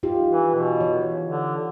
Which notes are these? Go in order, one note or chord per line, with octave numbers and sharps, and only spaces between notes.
D#4 F4 G4
E3
B2
E3 C#5
D3